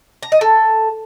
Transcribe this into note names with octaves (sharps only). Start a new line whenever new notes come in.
A#5
D#5
A4